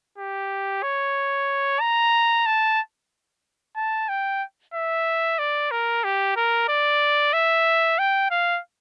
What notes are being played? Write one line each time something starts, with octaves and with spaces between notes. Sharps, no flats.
G4
C#5
A#5
A5
A5
G5
E5
D5
A#4
G4
A#4
D5
E5
G5
F5